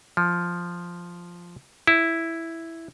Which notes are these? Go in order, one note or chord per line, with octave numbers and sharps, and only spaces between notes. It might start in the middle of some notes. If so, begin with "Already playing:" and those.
F3
E4